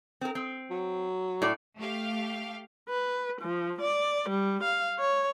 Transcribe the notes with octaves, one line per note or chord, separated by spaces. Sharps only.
C4 A#4
C4
F#3
A2 D5
A3 G4 F5
B4
F3
D5
G3
F5
C#5